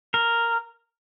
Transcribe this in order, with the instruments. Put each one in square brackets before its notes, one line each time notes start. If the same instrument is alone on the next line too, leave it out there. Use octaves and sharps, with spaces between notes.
[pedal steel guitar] A#4